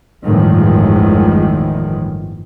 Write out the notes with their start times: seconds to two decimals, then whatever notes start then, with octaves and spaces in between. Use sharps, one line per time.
0.24 G1 E2 A2 D#3 F3 G#3